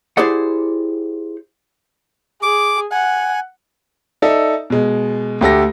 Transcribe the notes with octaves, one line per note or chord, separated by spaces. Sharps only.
E4 G4 G#4 C5 D5 F#5
G#4 D6
F#5 G#5
D#4 A4 D5 E5
B2 G#3
D2 G4 A4 A#6